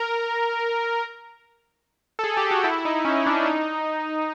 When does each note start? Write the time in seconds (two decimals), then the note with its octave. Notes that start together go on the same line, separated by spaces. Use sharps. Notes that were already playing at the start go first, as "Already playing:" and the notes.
Already playing: A#4
2.19 A4
2.24 G#4
2.37 G4
2.51 F#4
2.64 E4
2.85 D#4
3.05 C#4
3.26 D4
3.46 D#4